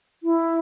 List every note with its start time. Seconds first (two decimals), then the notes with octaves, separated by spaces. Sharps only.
0.23 E4